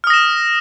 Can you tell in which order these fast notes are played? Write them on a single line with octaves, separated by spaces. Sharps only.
F6 D#6 A#6 E7